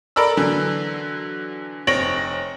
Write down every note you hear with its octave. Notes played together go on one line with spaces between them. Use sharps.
A4 A#4 D5 B5 E6
D3 E3 F#3
F1 C4 C#5 A#6 D7 F#7